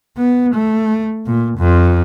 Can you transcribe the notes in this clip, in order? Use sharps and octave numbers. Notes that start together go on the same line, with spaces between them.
B3
A3
A#2
F2